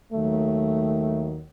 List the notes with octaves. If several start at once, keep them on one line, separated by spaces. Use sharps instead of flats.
D#2 D#3 F#3 A3